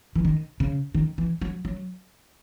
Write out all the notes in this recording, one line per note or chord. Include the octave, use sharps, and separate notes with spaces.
E3
D#3
C#3
D#3
E3
F#3
F#3